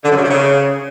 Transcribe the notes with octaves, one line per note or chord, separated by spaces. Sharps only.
D3
F#2
C#3
C3
C#3